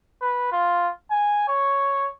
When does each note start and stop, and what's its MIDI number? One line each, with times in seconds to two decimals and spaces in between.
0.21 0.50 71
0.52 0.90 65
1.11 1.46 80
1.48 2.09 73